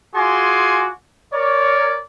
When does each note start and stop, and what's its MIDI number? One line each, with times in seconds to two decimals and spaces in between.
0.15 0.89 65
0.15 0.89 66
0.15 0.89 68
0.15 0.89 80
0.15 0.89 84
0.15 0.89 86
1.33 1.99 70
1.33 1.99 73
1.33 1.99 74